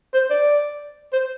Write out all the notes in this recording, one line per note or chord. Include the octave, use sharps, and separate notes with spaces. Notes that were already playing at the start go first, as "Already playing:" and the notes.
C5
D5
C5